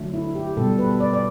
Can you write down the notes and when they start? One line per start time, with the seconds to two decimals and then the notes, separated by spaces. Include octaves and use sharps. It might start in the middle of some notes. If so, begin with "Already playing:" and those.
Already playing: D3 F#3 A3
0.14 E4
0.36 G4
0.57 B2 G3 A4
0.79 B4
1.00 D5
1.13 D5